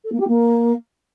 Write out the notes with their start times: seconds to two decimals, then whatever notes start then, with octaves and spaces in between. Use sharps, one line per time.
0.04 A4
0.12 A#3
0.20 G4
0.28 A#3